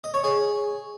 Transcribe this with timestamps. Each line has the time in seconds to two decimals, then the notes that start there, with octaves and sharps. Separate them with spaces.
0.04 D#5
0.14 C#5
0.24 G#4